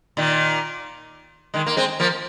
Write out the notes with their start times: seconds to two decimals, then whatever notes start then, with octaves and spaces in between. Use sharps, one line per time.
0.17 A#2 D#3
1.54 D#3 G#3
1.66 A#3
1.77 G#3 C4
2.00 F3 A#3